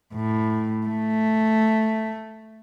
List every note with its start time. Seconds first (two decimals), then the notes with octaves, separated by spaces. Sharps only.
0.14 A2
0.87 A3